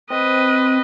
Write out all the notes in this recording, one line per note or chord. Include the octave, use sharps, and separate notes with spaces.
C4 B4 D#5